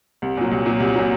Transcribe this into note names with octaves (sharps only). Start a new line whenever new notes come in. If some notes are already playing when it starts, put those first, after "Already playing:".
C2
A#2 F#3
C2
A#2 F#3
C2
A#2 F#3